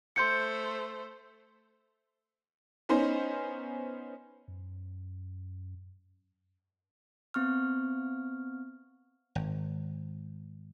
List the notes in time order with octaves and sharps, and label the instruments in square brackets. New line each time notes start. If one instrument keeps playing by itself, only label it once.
[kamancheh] A3 C5 [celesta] C6 G6 C#7
[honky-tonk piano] B3 C#4 D#4 C5
[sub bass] F#2
[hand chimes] B3 C4 C#6 F6
[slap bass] G#1